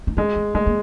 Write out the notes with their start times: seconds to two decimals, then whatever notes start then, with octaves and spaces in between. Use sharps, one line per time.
0.07 D#4
0.17 G#3 C#4
0.36 B3
0.54 G#3 A#3
0.67 A#3